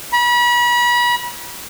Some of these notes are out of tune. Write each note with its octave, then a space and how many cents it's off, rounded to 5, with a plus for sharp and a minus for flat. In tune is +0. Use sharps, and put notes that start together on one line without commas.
B5 -35